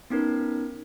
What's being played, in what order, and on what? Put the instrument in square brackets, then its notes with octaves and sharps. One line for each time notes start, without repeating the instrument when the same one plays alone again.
[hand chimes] B3 C#4 D#4 A#4 B4